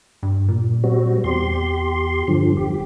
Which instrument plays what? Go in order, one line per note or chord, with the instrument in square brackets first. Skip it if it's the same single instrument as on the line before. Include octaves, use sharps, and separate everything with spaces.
[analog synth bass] G2
A#2
[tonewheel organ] G3 C4 F#4
[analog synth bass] E2 [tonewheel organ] G4 C6
[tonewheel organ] G2 D3 F3
[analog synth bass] E1 [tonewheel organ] G4